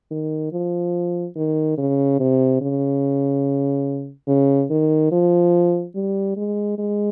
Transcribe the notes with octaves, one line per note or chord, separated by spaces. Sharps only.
D#3
F3
D#3
C#3
C3
C#3
C#3
D#3
F3
G3
G#3
G#3